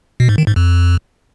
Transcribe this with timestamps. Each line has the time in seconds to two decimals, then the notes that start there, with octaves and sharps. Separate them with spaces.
0.20 B2
0.29 G#2
0.38 D#3
0.47 G#2
0.56 F2